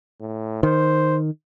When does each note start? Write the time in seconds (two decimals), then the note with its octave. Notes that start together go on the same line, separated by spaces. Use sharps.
0.21 A2
0.63 D#3 C5